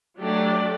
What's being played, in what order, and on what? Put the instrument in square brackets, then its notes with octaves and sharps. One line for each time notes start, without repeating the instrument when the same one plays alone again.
[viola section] F#3 A3 D4 G4 D5